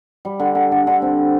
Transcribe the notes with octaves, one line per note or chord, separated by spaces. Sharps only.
G3
D3
D3
D3
D3
C4